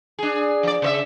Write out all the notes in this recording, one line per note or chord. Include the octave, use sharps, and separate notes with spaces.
D4 G#4
F3 D5
C#3 C5 E5